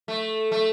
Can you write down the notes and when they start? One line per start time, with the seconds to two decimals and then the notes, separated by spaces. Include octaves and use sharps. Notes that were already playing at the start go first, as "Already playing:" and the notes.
0.08 A3
0.52 A3